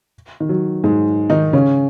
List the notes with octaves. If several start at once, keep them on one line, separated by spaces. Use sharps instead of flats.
D#3
F#3
G#2 G#3
D#3 D#4
C#3 C#4